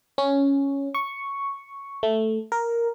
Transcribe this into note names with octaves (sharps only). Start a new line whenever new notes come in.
C#4
C#6
A3
A#4